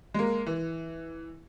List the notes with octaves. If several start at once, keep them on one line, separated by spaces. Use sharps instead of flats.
G#3 A#3
E3